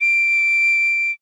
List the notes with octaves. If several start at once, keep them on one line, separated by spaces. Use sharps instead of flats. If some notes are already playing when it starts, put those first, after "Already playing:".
D7